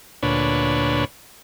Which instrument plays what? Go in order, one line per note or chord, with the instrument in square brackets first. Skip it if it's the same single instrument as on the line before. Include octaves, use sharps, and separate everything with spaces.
[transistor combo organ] D2 A#2 D4 B4 C#5